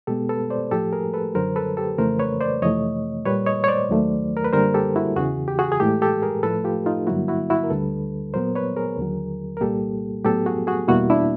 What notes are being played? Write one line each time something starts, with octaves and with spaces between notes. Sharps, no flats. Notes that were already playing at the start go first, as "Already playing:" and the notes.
B2 G#3 B3 G4 A4
A4 B4
C5 D5
A2 F3 A3 G4 A4
G#4 A#4
A4 B4
F#2 D3 F#3 A#4 C5
A4 B4
G4 A4
F2 C#3 E3 A3 A#4 C5
B4 C#5
C5 D5
F2 C3 E3 A3 C#5 D#5
A#2 G3 A#3 B4 C#5
C#5 D#5
C#5
C5 D5
D#2 D#3 F#3 A3
A#4
B4
F#2 D3 G3 A#3 A#4 C5
G4 A4
E4 F#4
E2 C#3 E3 F#4 G#4
G4
F#4 G#4
G#4
A2 E3 G#3 G4 A4
G4 A4
G#4 A#4
A2 F3 A3 A4 B4
F4 G4
D#4 F4
G2 D3 F#3 A#3 E4 F#4
E4 F#4
E4 F#4
A#4
D2 D3 G3 A4 B4
A#2 F#3 B3 A#4 C5
B4 C#5
G#4 A#4
D#2 D3 F#3
A#4
C2 A#2 G3 A#3 G4 A4
A2 F#3 B3 G4 A4
F#4 G#4
F#4 G#4
E2 B2 G3 A#3 E4 F#4
D4 E4